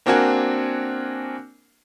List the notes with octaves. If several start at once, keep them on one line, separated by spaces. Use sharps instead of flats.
A#3 C4 D4 F#4 A#4 G#5